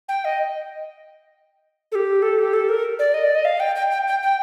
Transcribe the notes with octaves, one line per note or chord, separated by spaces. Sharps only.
G5
D#5
A4
G4
A4
G4
A4
A#4
D5
D#5
D5
D#5
F5
G5
G5
G5
G5
G5